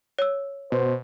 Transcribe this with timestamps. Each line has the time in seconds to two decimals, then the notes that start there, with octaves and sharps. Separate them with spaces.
0.19 C#5 E6
0.72 B2 C5